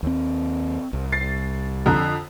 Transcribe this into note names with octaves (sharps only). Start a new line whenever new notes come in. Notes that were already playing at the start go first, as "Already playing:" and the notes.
D#2 C4
C2
A6 C7
F2 D3 A#5